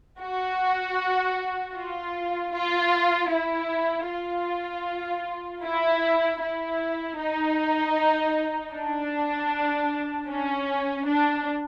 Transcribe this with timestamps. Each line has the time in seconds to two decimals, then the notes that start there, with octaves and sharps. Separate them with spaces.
0.20 F#4
1.75 F4
2.53 F4
3.31 E4
4.08 F4
5.63 E4
6.41 E4
7.18 D#4
8.73 D4
10.28 C#4
11.06 D4